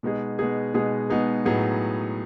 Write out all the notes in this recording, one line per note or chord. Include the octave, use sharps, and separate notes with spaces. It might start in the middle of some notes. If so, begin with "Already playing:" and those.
B2 G#3 B3 D#4 G#4
B2 G#3 B3 D#4 G#4
B2 G#3 B3 D#4 G#4
B2 G#3 B3 D#4 G#4
A2 F#3 B3 D#4 G#4